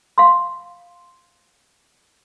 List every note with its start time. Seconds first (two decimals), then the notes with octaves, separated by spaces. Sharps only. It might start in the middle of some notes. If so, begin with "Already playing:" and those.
0.18 F5 C6